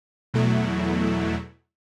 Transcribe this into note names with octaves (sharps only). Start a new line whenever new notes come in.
E2 B2 F#3 A3 E4